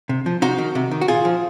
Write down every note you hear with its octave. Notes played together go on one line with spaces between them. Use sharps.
C3
F3
C3 D#4 F#4
D#3
C3
D#3
F#4
A#2 F4 G#4
F3